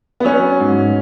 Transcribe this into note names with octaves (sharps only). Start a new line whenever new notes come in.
B3
F#3 C#4
G#2